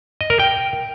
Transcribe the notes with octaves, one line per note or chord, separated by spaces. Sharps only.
D#5
A#4
G5